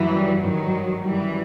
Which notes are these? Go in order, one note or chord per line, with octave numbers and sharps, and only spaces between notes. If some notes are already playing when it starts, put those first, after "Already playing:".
Already playing: F#2 E3
G3
G2 D#3 F#3
F#2 E3 G3